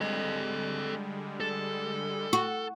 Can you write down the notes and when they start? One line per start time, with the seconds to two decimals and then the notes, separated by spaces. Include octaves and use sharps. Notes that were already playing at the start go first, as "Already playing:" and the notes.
0.01 D3 G3 G#3 A4 D#5
1.40 A4
2.33 F#4